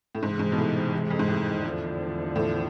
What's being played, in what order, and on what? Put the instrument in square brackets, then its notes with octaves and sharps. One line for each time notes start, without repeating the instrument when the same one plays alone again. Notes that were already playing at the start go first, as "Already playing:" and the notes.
[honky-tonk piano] A2
[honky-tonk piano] G#2 [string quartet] C3 E3 G#3
[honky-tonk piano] G#2
B2
A2
F2
G#2
A2
[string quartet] E2 D3 F3
[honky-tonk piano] A2